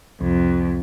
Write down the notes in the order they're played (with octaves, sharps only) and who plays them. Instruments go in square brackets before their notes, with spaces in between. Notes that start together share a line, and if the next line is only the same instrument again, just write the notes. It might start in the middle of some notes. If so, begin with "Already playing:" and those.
[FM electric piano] C2 [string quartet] F2